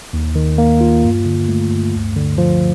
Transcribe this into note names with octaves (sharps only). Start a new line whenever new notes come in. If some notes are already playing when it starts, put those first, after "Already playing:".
D#2
D#3
A#3
F4
G2
D3
A3
G2
D2
D3
F3